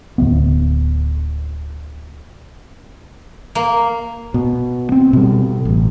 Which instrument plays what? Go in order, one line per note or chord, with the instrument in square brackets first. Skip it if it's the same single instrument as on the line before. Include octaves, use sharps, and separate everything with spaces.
[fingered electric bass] D1 D2 F#3 B3
[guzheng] A#3
[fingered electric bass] B2
C4
B2 G3
A1